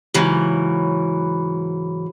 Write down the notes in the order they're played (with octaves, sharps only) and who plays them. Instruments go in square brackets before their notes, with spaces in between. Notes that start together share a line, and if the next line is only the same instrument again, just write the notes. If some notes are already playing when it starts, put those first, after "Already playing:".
[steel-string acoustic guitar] G#2 C#3 E3 F#3